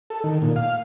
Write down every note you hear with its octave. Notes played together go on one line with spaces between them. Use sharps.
A4
D#3
A#2
F5